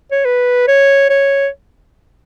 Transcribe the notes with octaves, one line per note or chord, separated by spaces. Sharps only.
C#5
B4
C#5
C#5